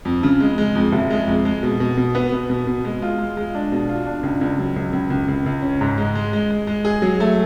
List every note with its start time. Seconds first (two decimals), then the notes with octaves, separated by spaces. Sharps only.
0.05 F2
0.23 C#3
0.40 G#3
0.58 G#3
0.75 F2
0.92 F#1
1.10 G#3
1.28 F2
1.45 G#3
1.63 B2
1.80 B2
1.97 B2
2.15 B3
2.32 B2
2.50 B2
2.67 B2
2.85 G#3
3.02 F4
3.19 G#3
3.37 G#3
3.55 D4
3.72 B2
3.89 F4
4.07 D4
4.23 C#2
4.41 C#2
4.59 F#3
4.76 C#2
4.93 C#2
5.10 C#2
5.28 C#2
5.46 C#2
5.62 C#4
5.81 G#2
5.98 G#3
6.15 G#3
6.33 G#3
6.50 G#3
6.67 G#3
6.85 G#4
7.02 F#3
7.20 A3